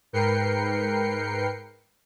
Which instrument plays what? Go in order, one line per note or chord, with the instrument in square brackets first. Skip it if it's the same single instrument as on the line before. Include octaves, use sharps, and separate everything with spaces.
[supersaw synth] G#2 A#4 B4 G5 C7 C#7